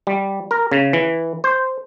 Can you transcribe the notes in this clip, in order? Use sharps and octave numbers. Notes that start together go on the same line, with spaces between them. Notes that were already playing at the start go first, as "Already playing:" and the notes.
G3
A#4
C#3
E3
C5